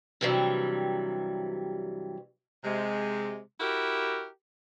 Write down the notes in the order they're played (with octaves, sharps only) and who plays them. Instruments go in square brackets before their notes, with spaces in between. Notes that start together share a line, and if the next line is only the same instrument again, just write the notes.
[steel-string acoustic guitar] G2 C3 E3 F#3 G3
[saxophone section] C3 G#3
E4 F#4 G4 A#4